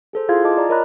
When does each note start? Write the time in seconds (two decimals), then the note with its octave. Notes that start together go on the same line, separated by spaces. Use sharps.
0.13 G#4 A4 C5
0.28 E4 F4 G#4 F5 C6 G#6
0.44 F4 D#5 A5 D6
0.57 D5 A#5
0.69 A#4 C#5 D#5 A#5 B5 F#6